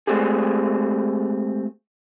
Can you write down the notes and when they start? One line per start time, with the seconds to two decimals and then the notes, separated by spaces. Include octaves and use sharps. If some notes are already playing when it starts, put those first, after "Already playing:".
0.07 G#3 A3 C4 G4 G#4